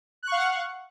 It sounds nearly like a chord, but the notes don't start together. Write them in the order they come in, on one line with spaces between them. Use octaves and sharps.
F#6 C#6 F5 F#5